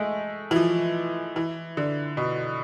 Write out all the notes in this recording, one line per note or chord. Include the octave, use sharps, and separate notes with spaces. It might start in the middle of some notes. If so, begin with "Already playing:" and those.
Already playing: G#3 A3
E3
F3
E3
D3
B2